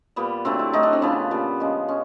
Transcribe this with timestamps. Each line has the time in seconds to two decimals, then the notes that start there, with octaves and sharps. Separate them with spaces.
0.16 A#2 G3 B3
0.45 D3 F#3 A3 C4
0.59 E4
0.73 A2 F#3 A3 D#4
0.83 D4
0.93 C4
1.02 C#3 F3 A3 B3
1.31 A#2 G3
1.60 C#3 F3 G#3
1.88 G#3 C#4